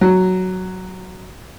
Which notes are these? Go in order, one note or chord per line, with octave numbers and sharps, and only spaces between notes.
F#3